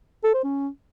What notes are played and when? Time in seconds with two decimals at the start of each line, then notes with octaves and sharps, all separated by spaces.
0.24 A4
0.34 C5
0.44 C#4